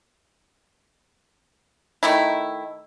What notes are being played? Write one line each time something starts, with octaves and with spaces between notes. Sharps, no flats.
D#3 A3 E4